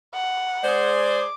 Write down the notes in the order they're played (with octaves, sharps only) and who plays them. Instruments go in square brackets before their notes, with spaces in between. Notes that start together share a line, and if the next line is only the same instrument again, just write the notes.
[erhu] F#5
[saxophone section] G#3 G#4 C5 [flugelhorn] D5
[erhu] D6